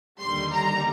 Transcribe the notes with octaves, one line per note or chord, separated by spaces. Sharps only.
D#2 D3 G3 C6
A#5